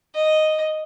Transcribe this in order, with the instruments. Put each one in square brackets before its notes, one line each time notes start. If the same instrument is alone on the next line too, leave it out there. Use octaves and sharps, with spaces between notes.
[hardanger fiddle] D#5